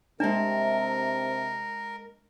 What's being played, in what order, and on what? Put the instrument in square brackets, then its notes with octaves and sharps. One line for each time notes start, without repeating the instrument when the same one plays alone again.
[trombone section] C3 [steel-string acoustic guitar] G#3 A5 [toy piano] D4 [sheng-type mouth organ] A#4